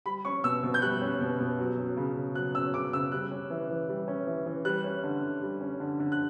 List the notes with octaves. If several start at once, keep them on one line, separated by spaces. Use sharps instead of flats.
G3 B5
C#4 C#6
B2 E6
B2
G6
G3 F#6
C#4
B2
B2
F#3
C#4
C#3
C#3
F#3 F#6
C#4 E6
C#3 D6
C#3 E6
G3 F#6
C#4
E3
E3
G3
C#4
E3
E3
G3 F#6
C#4
D3
D3
G3
C#4
D3
D3
F#6